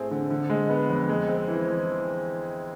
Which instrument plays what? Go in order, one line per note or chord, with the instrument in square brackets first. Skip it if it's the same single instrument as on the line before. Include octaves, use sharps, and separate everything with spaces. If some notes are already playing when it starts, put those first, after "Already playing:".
Already playing: [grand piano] A2 A3 C4 G#4
D3
D3
G#3
B3
F2
G#3
C4
E3
E3